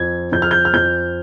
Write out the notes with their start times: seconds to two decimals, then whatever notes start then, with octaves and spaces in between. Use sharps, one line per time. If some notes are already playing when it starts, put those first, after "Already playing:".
Already playing: F2 G#6
0.32 F2 G6
0.42 F6
0.51 G6
0.65 F6
0.74 F2 G6